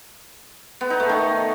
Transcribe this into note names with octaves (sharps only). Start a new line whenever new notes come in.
B3
D#4
A3
D#3